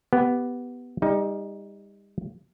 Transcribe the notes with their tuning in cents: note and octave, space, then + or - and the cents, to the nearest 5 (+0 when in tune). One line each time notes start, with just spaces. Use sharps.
B3 +0 G4 +0
G3 +35 D#4 +20